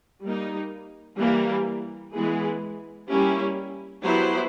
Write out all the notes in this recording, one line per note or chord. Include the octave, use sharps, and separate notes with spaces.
G3 A#3 D#4
E3 G3 A#3
E3 G#3 B3 E4 G#4
G3 A#3 C#4 E4 G4
F#3 B3 E4 G4 C5